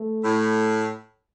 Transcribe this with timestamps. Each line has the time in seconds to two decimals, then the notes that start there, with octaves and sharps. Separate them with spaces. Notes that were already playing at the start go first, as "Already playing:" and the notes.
Already playing: A3
0.23 A2